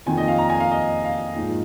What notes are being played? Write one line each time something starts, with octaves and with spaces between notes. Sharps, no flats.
F2 D#3 A#3 D#4 G#5
D#5
F5
A#5
G#5
F5
D#5
F5
G#2 F3 A#3 D#4